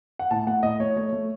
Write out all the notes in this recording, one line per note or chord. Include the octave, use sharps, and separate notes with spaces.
F#5
A2 A5
A3 F#5
A2 D#5
A3 C#5
A3 C#5
A3